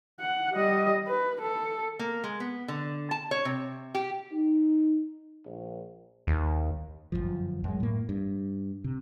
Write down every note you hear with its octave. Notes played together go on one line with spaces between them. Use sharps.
F#5
G3 D#5
B4
A4
A#3
G#3
B3
D3
A5
C#5
C3
G4
D#4
A#1
D#2
G1 C2 F#2 F3
F#2 F#3 G#3
A2 A#3
G2
C3